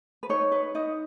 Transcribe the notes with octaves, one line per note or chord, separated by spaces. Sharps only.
B4
D#4 C#5
B4
D#4 D#5